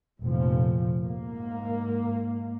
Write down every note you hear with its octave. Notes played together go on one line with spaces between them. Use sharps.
F1 A#2 F3
G#2 A#3